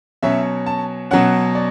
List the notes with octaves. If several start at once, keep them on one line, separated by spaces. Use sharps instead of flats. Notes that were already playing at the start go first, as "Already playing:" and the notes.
B2 F#3 C#4 E5
A5
B2 F#3 C#4 F#5
D5